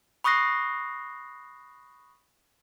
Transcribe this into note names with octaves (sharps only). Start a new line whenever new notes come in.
B5 C#6 D#6 F#6 A#6 C7